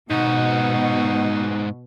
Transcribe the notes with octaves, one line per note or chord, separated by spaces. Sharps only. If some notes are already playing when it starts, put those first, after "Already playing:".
G#2 B2 D#4 F#4 F#5